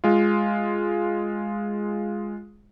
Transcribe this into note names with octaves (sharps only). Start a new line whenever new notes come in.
G#3 F4